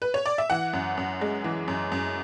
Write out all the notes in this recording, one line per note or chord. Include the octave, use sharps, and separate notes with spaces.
B4
C#5
D5
E5
E3 F#5
F#2
F#2
G#3
E3
F#2
F#2